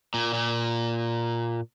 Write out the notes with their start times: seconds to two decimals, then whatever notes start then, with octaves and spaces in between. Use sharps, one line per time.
0.14 A#2
0.34 A#2